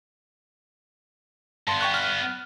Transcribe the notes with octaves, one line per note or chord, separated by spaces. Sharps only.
G2 B3 A5 C6
G5 C#6 F#6
F6